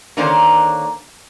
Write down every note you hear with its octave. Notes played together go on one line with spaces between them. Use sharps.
D3 D#3 A#3 C#4 D4 C5